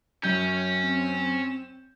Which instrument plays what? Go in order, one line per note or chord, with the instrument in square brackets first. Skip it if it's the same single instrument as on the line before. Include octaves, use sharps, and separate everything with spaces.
[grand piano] F#2 G6 [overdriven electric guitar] C#4 [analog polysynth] G5
[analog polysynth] C4 E7